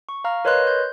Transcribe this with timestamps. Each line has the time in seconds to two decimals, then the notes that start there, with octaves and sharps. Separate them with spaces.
0.09 C#6
0.24 F5 A#5 F6
0.45 A#4 B4 C#5 D#5 C6 F#6
0.67 G6